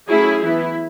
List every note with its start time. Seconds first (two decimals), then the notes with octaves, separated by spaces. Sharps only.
0.08 F#3 A3 C#4 E4 G#4
0.43 E3 B3 E4